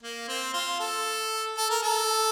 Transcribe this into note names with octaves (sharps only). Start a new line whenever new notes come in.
A#3
C4
F4
A4
A4
A#4
A4